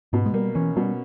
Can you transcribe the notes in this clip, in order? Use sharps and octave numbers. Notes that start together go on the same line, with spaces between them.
G#2 B2
G#3
G3 A#3
E3 C#4
B2 G3